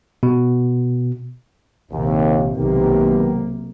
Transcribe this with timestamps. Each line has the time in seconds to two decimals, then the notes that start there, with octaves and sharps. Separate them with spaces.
0.23 B2
1.91 A#1 D#2 C3
2.57 B1 C3 D#3 A#3 B3 G4